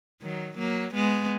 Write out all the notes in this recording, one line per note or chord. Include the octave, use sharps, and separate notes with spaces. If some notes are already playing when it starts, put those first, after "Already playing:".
D#3 F#3
F#3 A#3
G#3 B3